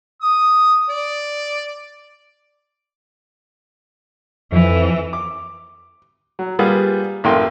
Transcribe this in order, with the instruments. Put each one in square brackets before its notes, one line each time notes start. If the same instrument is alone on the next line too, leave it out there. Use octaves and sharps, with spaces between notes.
[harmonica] D#6
D5
[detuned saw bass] F2 [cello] E3
[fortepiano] D6
F#3
G3 A#3 F4 G#4 B4 F#5
A1 F#2 A#3 A4 G5 C6